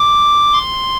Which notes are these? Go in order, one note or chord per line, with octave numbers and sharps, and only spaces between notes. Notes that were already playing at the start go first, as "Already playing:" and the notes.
Already playing: D6
C6